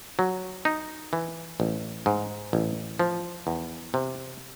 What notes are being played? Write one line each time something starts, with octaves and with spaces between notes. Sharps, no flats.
F#3
D#4
E3
A1
G#2
A1
F3
E2
C3